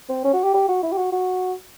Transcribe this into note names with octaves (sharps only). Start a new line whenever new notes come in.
C4
C#4
F#4
G4
G4
F#4
E4
G4
F#4
F#4